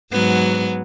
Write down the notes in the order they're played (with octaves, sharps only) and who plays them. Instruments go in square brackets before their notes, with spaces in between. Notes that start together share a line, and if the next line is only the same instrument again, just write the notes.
[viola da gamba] G#2 F#3 B3